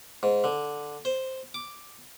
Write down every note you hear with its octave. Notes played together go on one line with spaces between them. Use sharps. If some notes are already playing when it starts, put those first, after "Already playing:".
G#2
D3
C5
D6